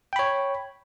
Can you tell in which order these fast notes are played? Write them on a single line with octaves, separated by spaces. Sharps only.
G5 B5 C#5